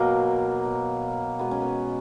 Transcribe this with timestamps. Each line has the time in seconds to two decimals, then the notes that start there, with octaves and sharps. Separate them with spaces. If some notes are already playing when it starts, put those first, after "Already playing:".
Already playing: B2 F#3 A#3
0.65 B2 F#3
1.39 B2 G#3 B3
1.51 C#4
1.62 B3